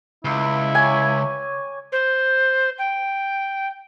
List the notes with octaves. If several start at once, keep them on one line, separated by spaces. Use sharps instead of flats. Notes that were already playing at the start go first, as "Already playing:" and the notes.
C#2 E4
C#5 G#5 C#6 D6
C5
G5